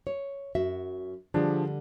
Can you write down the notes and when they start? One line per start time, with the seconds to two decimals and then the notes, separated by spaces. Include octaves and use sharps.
0.07 C#5
0.55 F#2 F#4 E5
1.34 D3 F3 G3 D4 G#4